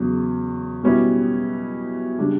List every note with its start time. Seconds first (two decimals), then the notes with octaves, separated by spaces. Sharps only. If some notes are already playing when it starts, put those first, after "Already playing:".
Already playing: E2 C#3 F#3
0.83 B2 G3 C#4 E4 G4
2.18 C#3 G3 D4